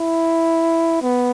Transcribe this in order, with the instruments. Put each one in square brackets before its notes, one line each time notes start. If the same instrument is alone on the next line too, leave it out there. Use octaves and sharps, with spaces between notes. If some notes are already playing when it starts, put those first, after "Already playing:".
Already playing: [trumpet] E4
B3